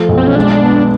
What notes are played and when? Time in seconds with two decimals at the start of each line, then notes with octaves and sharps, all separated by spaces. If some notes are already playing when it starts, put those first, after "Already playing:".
Already playing: F3 A3
0.09 B1
0.17 C4
0.27 C#4
0.35 G#3 D4
0.62 B3